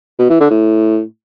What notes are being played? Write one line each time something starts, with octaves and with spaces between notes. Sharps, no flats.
B2
E3
D3
A2